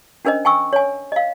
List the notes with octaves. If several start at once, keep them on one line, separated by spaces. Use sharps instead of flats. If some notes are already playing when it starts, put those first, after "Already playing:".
C#4 D4 A#4 C5 D#5
G5 G#5 C#6 E6
C#5 G#5
D#5 F5